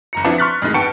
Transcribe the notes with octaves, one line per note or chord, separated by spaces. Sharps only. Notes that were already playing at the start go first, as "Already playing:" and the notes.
F#1 A#5 C#7
F3 B3 C4 D4 E4 D5
C6 C#6 F6 F#6 A6 B6
F2 A2 D#3 G#3
G#2 B3 G5 A5 C#6 C#7